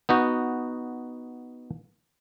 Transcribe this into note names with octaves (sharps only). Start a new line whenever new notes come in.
B3 D#4 F#4